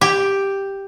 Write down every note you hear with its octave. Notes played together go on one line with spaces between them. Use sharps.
G4